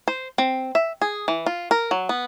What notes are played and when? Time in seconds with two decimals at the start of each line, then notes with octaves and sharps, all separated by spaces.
0.08 C5
0.38 C4
0.75 E5
1.02 G#4
1.28 E3
1.46 F4
1.71 A#4
1.91 F#3
2.09 B3